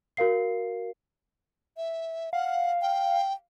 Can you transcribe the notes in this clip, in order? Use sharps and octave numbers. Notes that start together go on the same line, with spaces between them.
F#4 A#4 F5 C7
E5
F5 F#5
G5